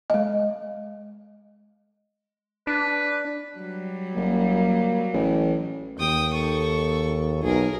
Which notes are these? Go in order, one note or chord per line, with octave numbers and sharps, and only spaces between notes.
G#3 D#5
D4 B4
F#3 G3
F#1 A#3
A1
D#2 G5 D#6
A4 C#6
B1 G#4 A#4